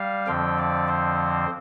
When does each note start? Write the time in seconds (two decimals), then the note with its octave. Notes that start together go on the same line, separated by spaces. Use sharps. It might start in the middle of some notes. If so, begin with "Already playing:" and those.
Already playing: G3 F5
0.27 F2 D3 F3 C4 G5
0.58 D5
0.88 C5